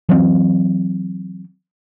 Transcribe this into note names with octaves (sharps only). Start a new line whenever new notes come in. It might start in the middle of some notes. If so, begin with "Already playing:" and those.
E3 F#3 A3 C4